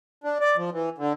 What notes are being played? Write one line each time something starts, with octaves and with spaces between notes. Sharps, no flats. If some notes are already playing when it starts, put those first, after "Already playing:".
D4
D5
F3
E3
D3